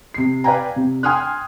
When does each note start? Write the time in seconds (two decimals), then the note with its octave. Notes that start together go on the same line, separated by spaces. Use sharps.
0.14 C3 C7
0.44 B4 D5 F5 G5 G#5 A#5
0.76 C3
1.03 G5 G#5 C6 D#6 F6 F#6